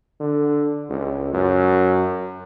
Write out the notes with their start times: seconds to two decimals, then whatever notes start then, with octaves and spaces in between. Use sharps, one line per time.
0.20 D3
0.90 C#2
1.34 F#2